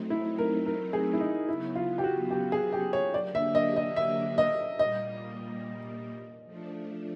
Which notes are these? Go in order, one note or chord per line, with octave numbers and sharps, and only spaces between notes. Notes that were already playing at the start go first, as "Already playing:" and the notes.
Already playing: F#3 A3 C4 D#4
E4
A#4
A#4
G#4
E4
D#4
C#3 F#3 B3 E4
F4
G4
F#4
G4
G#4
G4
C#5
D3 F#3 A#3 D4 G4 D5
E5
D#5
D#5
E5
D#5
A#2 G3 A#3 D#5
F3 A3 D4